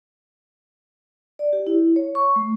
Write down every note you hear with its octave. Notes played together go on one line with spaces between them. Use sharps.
D5
G4
E4
C#5
C#6
A3